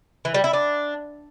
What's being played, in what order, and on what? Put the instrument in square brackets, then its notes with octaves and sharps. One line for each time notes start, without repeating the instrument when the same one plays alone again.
[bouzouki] E3
G3
E4
D4